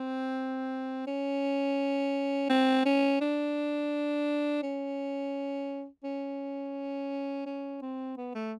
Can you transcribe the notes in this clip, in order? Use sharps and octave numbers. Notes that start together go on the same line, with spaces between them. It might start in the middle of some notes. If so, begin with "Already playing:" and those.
Already playing: C4
C#4
C4
C#4
D4
C#4
C#4
C#4
C4
B3
A3